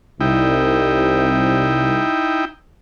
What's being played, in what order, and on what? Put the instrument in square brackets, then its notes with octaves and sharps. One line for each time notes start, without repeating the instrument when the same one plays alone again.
[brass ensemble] C2 [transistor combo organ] D#4 E4 G5